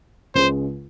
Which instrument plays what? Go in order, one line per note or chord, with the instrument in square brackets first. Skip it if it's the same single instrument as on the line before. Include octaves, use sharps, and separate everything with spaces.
[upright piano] C#2 C#3 G#3 [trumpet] C5